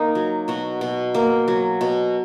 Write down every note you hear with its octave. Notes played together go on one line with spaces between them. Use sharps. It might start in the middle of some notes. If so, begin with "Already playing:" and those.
Already playing: A#3 D#4
F#3
B2 F#4
B2
A#3
F#3
B2